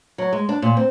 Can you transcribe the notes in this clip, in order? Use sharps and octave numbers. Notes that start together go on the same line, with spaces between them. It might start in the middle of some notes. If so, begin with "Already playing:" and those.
F#3
G#3
D4
A#2
C4